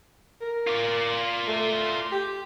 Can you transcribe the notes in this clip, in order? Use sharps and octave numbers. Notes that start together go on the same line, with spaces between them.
A#4
F4 D5
A3
G4